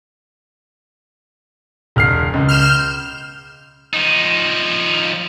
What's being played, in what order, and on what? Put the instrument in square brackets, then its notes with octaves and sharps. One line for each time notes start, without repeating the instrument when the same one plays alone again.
[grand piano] E1 F6 C7
C#2
[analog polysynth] F6 G6 E7
[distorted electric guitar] F3 D#4